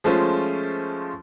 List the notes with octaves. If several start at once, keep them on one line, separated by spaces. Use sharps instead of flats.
F3 G#3 A3 C#4 F4 C5